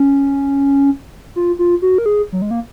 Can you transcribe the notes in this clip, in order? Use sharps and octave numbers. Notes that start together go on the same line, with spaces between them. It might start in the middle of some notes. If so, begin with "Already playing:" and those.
Already playing: C#4
F4
F4
F#4
A#4
G#4
F#3
G#3
A#3